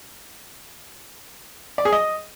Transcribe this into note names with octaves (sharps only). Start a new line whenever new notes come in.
D5
G#4
D#5